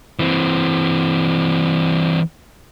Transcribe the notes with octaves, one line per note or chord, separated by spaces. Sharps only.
E3 C4